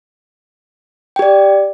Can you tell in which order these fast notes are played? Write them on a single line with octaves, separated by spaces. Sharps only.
G5 G4 D5